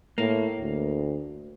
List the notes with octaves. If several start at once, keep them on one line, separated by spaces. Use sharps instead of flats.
A2 A#3
D2